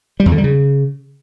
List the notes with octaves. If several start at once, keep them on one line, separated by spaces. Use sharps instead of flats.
G3
E2
D3
G3
C#3